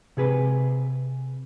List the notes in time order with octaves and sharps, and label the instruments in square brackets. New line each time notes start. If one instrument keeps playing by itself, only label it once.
[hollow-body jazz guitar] C3 G#4 B4